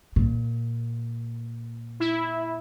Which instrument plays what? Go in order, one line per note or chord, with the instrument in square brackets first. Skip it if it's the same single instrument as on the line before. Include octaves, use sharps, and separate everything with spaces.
[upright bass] A#2
[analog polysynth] E4